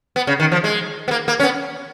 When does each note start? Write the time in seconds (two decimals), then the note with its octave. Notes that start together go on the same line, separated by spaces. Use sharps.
0.16 B3
0.27 C#3
0.40 D#3
0.52 F3
0.64 G#3
1.08 B3
1.11 A#3
1.28 A#3
1.40 C#4
1.43 B3